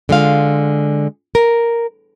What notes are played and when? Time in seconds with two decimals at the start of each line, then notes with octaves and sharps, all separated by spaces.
0.09 D3 G#3 F4 F5
1.35 A#4